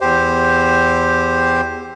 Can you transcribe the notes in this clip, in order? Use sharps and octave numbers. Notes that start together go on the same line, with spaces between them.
E2 G4 C5